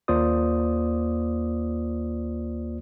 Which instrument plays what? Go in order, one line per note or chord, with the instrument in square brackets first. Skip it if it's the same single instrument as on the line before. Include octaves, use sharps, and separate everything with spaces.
[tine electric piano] D#2 A#3 F4 C5 D5 D#6